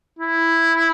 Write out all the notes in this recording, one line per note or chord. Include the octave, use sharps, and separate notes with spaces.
E4